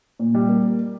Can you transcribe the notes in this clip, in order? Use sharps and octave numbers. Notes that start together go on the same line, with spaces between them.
A#2
G3
A#3